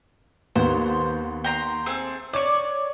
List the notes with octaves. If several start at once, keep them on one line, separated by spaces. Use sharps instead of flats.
D#2 B3 C5
G5 A#5 C6
A3 C4 G#4
C#5 D5 C#6